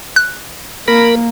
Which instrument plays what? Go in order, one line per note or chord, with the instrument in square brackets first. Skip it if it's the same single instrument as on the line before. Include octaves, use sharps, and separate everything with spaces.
[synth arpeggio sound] F#6
[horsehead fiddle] A#3 [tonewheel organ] A#4 B5